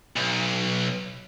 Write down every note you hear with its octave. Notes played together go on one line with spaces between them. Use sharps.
B1